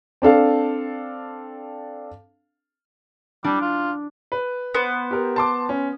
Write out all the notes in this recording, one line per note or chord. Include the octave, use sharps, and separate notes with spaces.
C4 D4 A4 F5
G3 D4
F4
B4
B3 C5
G4 A#4
A5 C6 D6
C#4